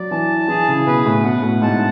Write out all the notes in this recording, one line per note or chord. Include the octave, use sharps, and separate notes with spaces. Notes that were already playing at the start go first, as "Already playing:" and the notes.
Already playing: F#3 D5
E3 A5
E3 G#4
C#3
B2 B4
A2
B2 F#5
A2
G#2 A5